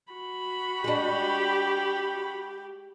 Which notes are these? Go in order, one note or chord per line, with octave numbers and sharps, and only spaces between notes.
F#4 B5
G#3 D4 G4